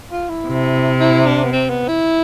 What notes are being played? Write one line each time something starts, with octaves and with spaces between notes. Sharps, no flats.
F4
E4
C3
E4
D4
B3
C4
B3
E4